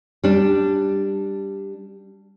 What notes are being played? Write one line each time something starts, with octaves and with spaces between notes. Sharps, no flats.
G3 D4